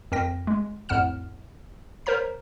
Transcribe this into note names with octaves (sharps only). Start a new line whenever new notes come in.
F2 A#4 G5 A#6
G#3
A#1 F2 A2 F#5 F6 E7
A#4 C5 C#5 A#5 B6